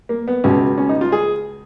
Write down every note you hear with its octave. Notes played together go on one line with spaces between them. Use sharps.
A#3
B3
C#2 B2 C#4
C#4
D#4
F4
G#4